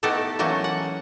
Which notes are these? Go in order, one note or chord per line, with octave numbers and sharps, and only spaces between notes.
A3 B3 D#4 E4 G4 A4
E3 F#3 A3 A#3 C#4
F#5